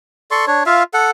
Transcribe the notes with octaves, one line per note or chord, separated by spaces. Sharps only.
A4 D5 C6 C#6
D4 C#5
F4 E5 F5
A4 F#5